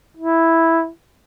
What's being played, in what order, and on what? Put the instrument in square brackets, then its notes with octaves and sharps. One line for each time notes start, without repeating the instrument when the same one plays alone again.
[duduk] E4